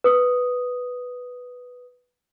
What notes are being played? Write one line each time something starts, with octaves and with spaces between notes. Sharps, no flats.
B4 D#6